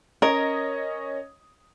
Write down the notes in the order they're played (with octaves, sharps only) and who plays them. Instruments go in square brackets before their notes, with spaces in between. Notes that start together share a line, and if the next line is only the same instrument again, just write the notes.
[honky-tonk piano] C#4 C#5 D#5 [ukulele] A#4